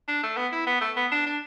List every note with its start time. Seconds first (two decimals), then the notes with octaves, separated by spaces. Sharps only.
0.08 D4
0.23 A3
0.37 B3
0.52 E4
0.66 B3
0.81 A3
0.96 B3
1.12 D4
1.26 D4